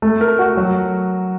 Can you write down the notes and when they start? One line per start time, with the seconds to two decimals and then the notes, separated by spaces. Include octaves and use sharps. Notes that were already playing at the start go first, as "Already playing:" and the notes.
0.02 A3
0.21 A#4
0.39 F#4
0.57 F#3